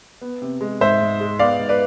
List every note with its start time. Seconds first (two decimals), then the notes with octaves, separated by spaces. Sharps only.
0.21 B3
0.42 C3
0.61 G#3
0.81 G#2 C5 E5
1.01 G#2
1.20 G#3
1.39 B3 D5 F5
1.59 G#2
1.69 B4 D5